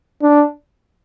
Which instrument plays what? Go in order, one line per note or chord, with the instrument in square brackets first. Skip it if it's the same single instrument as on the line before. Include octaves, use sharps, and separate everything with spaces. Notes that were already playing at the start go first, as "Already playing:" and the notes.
[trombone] D4